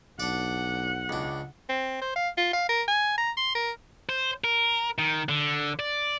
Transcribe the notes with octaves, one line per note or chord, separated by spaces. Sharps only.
B1 D4 D5 F#5
C#2 D4
C4
C5
F5
F4
F5
A#4
G#5
A#5
C6
A#4
C5
A#4
D#3
D3
D5